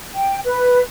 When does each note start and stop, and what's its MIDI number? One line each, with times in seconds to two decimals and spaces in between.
0.15 0.39 79
0.44 0.81 71